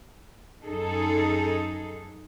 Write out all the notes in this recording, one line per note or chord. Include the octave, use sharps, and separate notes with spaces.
F#2 D#4 G#4 A4